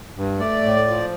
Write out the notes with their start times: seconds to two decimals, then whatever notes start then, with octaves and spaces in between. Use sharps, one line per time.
0.16 G2
0.39 A3 D5
0.63 A2
0.87 F3